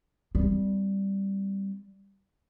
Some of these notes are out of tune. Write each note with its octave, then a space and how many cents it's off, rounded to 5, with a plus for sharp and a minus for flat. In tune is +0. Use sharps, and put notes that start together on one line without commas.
G3 +0 C4 -20